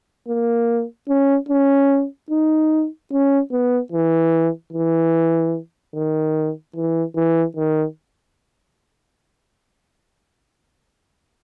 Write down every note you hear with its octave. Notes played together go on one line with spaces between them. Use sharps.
A#3
C#4
C#4
D#4
C#4
B3
E3
E3
D#3
E3
E3
D#3